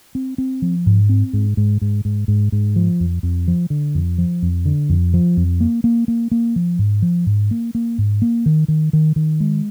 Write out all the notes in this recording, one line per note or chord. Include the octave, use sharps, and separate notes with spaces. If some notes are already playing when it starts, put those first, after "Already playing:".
C4
C4
F3
G#2
C4
G#2
G#2
G#2
G#2
G#2
G#2
F3
F2
F2
F3
D3
F2
F3
F2
D3
F2
F3
F2
A#3
A#3
A#3
A#3
F3
G#2
F3
G#2
A#3
A#3
G#2
A#3
D#3
D#3
D#3
D#3
G#3